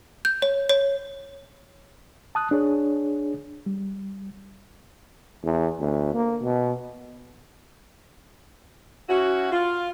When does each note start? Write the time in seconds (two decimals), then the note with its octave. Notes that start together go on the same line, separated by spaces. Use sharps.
0.25 G6
0.42 C#5
0.69 C#5
2.35 A5 D#6 F#6
2.51 D4 G#4 C#5
3.66 G3
5.44 E2
5.80 D2
6.15 A#3
6.43 B2
9.09 C#4 E4 F#4
9.52 F4